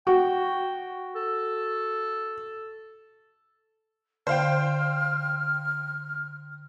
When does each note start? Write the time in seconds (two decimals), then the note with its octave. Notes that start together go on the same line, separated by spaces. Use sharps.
0.07 F#4 G5
1.16 A4
4.27 D3 C5 F5 G5 F6